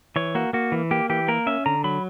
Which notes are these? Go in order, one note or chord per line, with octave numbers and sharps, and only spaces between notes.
E3 C#5
A#3 F#4
A#3 F#4
E3
A#3 G4
E3 G4
A#3 A#4
C#4 E5
D3 A#5
F#3 B5